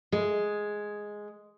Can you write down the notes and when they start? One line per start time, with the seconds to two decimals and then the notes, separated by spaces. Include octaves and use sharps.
0.12 G#3